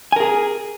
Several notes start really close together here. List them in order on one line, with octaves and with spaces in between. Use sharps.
G#5 A#4 G#4